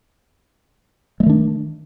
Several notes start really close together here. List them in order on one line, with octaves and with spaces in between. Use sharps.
G#3 A3 D#3 D4